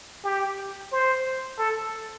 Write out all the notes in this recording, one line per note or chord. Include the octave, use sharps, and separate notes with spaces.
G4
C5
A4